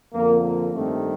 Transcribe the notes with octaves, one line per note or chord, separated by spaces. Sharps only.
F2 D3 F3 A#3
A#3
G2 D#3 G3 A3 C4